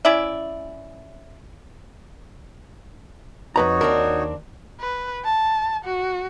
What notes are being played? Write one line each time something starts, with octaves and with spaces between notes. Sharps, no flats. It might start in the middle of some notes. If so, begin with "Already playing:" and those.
C#4 E4 D5 E5
F2 D#4 F#4 B4 C#5 A#5
D#2 C4 D4 A#4
B4
A5
F#4